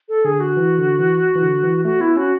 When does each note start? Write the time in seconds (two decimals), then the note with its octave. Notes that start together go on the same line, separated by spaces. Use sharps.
0.09 A4
0.25 D3 G#4
0.40 F#4
0.57 E3
0.78 D3
0.99 E3
1.35 E3
1.43 D3
1.63 E3
1.85 A3 F#4
2.00 B3 E4
2.16 C#4 F#4